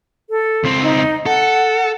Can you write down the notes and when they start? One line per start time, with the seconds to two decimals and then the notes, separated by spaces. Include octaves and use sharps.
0.30 A4
0.64 C#2 C4
0.82 D#4
1.26 A4 F#5